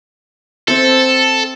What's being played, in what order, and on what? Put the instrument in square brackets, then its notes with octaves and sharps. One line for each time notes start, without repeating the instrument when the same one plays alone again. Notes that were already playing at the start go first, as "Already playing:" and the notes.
[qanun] C4 E5 [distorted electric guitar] A4